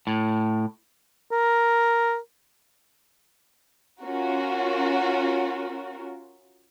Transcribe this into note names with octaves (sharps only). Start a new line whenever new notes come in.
A2
A#4
C#4 F4 F#4 A#4